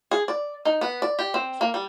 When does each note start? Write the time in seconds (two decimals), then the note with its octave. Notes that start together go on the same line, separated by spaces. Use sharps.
0.11 G#4
0.28 D5
0.65 D#4
0.81 B3
1.02 D5
1.19 G4
1.34 C4
1.61 A#3
1.74 G3